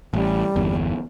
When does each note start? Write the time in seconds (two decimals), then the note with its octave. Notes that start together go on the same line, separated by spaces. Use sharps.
0.14 A1 G3
0.56 G1 E2